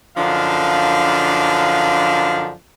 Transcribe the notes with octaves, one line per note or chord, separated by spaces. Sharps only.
F#2 D3 F3 D4 D#4 F5